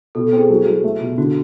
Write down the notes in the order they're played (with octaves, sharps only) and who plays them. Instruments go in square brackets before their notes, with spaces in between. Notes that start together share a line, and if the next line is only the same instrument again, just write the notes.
[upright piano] B2 [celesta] A4
[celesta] A4
[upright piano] C4
[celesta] G#4
[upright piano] F#3
F#3
A3
B2
[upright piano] D3 [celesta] F#4